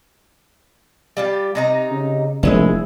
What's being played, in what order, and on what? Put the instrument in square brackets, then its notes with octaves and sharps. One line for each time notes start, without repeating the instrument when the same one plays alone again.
[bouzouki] G3 F4 G4
C3 D#4 A#5
[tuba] C#3
[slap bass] F1 G#3 [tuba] A#1 [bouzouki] E4 G#4 E5